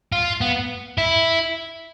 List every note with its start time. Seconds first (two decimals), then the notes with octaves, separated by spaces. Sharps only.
0.12 F4
0.41 B3
0.98 E4